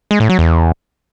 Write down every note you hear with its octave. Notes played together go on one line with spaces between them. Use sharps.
G#3
A2
F#3
E2